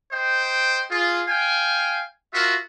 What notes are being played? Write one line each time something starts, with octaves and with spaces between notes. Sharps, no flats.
C5 D#5 G5
F4 G#4
F5 G5 G#5
F4 F#4 A#4 E5